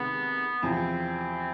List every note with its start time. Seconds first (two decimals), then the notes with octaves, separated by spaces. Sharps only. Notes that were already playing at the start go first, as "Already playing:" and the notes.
Already playing: C3 D#3 G#3 B3
0.62 E2 C3 F3 C4